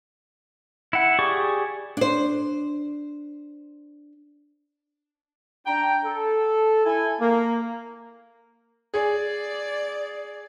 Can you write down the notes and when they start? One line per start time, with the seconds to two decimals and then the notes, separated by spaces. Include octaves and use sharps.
0.93 E4 F#5
1.19 G4 G#4 D5 C#6
1.97 D4 C5
5.66 D4 G5 A#5
6.05 A4
6.85 E4 A4 G#5
7.20 A#3
8.94 G#4 D5